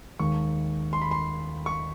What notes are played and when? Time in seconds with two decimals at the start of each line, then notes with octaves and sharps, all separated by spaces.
0.19 D#2 D#3 G#3 C#6
0.93 C6
1.02 B5
1.11 C6
1.66 C#6